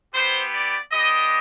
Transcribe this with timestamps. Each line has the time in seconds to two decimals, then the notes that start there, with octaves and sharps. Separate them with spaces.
0.13 B3 E4 G4 C5
0.52 D5
0.91 B3 D4 G4 D#5